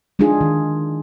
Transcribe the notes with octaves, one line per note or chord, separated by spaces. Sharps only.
G#3 D4 D#4 F4 G#4
D#3